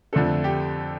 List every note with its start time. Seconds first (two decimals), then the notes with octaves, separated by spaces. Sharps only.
0.13 F2 D3 A3 D4 A4
0.44 G4